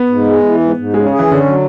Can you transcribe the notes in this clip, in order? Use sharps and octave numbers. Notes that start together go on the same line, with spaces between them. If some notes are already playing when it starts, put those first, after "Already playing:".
Already playing: B3
G#2
G#3
E3
G#2
G#2
C#3 G#3
C#4 G#4
E3
D3 C#4
F#3